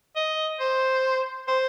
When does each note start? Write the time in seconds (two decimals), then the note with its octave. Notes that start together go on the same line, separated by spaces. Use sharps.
0.16 D#5
0.60 C5
1.48 C5